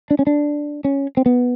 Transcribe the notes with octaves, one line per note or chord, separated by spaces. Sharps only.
D4
C#4
D4
C#4
C4
B3